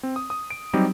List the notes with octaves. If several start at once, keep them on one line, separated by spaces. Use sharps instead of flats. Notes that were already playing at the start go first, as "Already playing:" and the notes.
C4
D#6
D#6
D7
F#3 G3 C4 D#4 G4